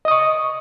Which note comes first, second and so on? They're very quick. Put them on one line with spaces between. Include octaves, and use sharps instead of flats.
D#5 D#6 C#6